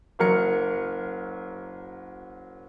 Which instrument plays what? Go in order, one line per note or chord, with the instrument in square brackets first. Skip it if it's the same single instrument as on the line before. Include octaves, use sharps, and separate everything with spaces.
[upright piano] F#1 F#3 A#4 C#7